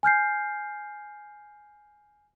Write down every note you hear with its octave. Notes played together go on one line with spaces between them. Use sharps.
G#5 F6 G6 C7